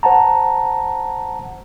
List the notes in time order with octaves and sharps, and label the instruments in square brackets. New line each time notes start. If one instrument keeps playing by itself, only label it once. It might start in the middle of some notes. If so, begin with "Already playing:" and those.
[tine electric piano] C5 F#5 A5 A#5